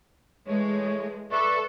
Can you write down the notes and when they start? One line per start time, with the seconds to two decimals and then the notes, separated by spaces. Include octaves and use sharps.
0.47 E3 G#3 A3 C#5
1.32 A4 B4 D5 E5 C#6